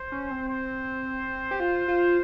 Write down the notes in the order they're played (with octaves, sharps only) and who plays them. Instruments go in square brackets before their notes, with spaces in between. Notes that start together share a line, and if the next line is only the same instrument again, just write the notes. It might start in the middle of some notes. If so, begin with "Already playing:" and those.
Already playing: [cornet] C5
[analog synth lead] C#4
C4
[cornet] C5
[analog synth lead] G4
F4
F4